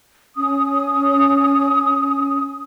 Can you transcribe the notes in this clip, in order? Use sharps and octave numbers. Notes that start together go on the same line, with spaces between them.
C#4 D#6